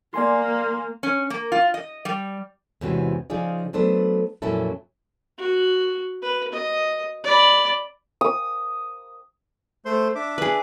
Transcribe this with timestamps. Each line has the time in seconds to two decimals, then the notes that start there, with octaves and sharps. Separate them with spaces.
0.14 A#3 D5 G#5 C6
1.03 C#4
1.30 A#3
1.52 F4
1.74 D#5
2.05 G3
2.81 E2 G#2 C3 E3 C#4 F#4
3.30 C#3 F3 D#4 F4 G#4 D5
3.73 F#3 A3 B3 D4 A4 C5
4.42 F2 A#2 F#3 C#4 E4 A4
5.38 F#4
6.22 B4
6.53 D#5
7.24 D5 B5
8.21 D#6
9.85 A3 C5 C6
10.15 D4 E5 D6
10.38 G#4 B4